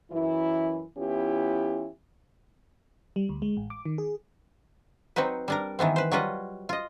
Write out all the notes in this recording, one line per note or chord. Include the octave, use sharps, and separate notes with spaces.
F#2 E3 E4
E3 B3 C#4 E4 F4 G4
G3
D2
G#3
A1
D6
D#3
G#4
F#3 C4 D#4 F#4 B4
G3 D4 A#4
D#3 E3 B3 C4
B4 C5
F#3 G3 F4 B4 D#5
F4 D#5